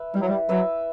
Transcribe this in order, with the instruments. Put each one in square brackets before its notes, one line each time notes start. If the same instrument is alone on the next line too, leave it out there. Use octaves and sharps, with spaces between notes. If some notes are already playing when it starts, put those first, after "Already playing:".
Already playing: [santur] B4 E5
[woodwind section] G3 [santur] E4
[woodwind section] F#3
G3
[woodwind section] F#3 [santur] B4 E5